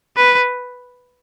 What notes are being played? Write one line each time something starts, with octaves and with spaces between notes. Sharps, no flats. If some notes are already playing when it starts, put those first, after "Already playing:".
B4